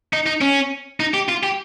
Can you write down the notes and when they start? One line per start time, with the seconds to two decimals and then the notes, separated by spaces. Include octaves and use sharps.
0.13 D#4
0.26 D#4
0.41 C#4
1.00 D#4
1.14 G4
1.29 F4
1.43 G4